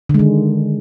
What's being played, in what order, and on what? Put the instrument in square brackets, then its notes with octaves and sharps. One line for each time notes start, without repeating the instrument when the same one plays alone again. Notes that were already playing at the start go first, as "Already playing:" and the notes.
[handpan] D3
G#3
D#3